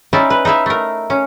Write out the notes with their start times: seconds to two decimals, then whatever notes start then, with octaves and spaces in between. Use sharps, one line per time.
0.13 C#4 D#4 E4 D5 E5
0.30 B4
0.45 D#4 E4 E5 F5
0.66 A3 A#4
1.10 C#4